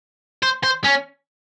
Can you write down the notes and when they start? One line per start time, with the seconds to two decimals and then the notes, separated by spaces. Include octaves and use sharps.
0.43 C5
0.63 C5
0.84 C#4